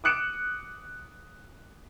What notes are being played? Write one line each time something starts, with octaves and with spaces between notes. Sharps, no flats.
D6 D#6 F#6 C#7 D7 E7